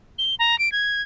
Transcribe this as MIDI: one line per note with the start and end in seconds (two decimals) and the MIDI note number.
0.19 0.35 103
0.39 0.58 82
0.59 0.71 98
0.72 1.02 92